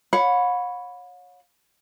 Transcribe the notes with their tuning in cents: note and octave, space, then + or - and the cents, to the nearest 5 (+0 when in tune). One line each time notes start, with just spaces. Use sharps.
C#5 +0 F#5 -45 B5 +0